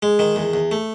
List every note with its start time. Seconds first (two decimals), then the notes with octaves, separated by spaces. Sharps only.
0.03 G#3
0.19 D#3
0.36 E2
0.54 E2
0.71 A3